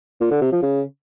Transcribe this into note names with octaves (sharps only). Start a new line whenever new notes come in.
A#2
D3
C3
F3
C#3